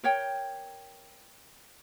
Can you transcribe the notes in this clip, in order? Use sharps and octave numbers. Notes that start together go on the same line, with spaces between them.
A#4 C#5 G5